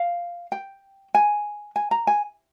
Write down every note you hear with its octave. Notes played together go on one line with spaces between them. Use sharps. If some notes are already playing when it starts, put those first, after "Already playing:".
Already playing: F5
G5
G#5
G#5
A#5
G#5